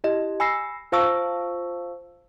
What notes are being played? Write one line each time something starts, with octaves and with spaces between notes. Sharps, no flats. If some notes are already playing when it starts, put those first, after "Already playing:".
E4 G4 D#5
G#5 B5 E6 A#6 C7
F4 C5 F5 A5 C#6 E6